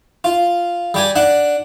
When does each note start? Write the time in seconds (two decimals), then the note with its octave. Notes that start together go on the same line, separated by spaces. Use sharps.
0.24 F4
0.94 G3 G4 G#5
1.16 D4 F#5